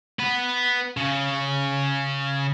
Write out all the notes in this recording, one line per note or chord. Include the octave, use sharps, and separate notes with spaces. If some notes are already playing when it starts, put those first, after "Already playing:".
B3 B4
C#3